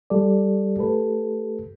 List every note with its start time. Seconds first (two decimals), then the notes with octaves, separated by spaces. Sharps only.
0.10 G3 G4 A4 D5
0.77 A3 G4 A4 B4